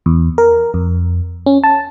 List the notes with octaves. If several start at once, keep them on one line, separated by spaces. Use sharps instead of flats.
E2
A#4
F2
C#4
A5